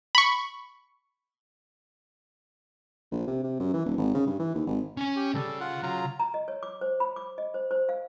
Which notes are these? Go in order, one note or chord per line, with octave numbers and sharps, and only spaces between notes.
B5 C#6
A#1
C3
C3
F#2
E3
D#1
G#1
C#3
G2
E3
D#2
G#1
C#4 G#5
G4
D2 C#3 G3 A4
F4 F#5
C#3 F#3 F4 A#5
A#5
D#5
C#5
D6
C5
B5
D6
D#5
C5
C5
F5